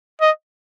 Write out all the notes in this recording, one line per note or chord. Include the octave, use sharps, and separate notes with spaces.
D#5